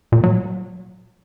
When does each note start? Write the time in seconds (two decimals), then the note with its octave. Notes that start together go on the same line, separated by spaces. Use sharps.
0.12 A#2
0.24 F#3